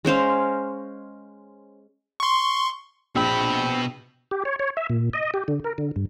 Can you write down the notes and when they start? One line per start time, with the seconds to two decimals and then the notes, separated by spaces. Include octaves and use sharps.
0.05 G#3 C#4 C5 F5
2.20 C6 C#6
3.15 A#1 B2 C4 B5
4.31 G4
4.45 C#5
4.59 C#5
4.77 E5
4.90 A#2
5.13 D#5
5.34 G4
5.48 D3
5.64 A#4
5.78 D3
5.96 G2